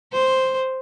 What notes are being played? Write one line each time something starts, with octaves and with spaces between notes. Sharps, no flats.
C5